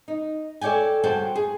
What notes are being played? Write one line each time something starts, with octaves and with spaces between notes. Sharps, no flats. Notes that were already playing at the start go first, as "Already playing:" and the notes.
D#4
A4 C#5 D5 G5 G#5
G2 F#4 G#4 C5 G5 A5
G#4